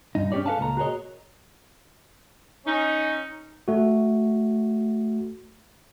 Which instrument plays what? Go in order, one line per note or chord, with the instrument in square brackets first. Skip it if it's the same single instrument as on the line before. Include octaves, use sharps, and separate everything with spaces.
[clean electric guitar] G2 D#4
C#4 D4 E4 G4 C#5 D5
A4 B4 E5 F5 G#5 A5
C#2 A#2 A#5
F#4 G#4 A#4 B4 C#5 D#5
[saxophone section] C#4 D#4
[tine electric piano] A3 F#4